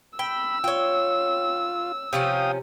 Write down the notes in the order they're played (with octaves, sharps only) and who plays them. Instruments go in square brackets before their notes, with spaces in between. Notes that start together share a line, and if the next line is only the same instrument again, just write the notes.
[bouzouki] G5 [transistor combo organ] B5 [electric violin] E6
[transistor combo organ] F4 [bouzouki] C#5 G5
[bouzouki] C3 F3 C#4 [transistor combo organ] F5 G5 D#6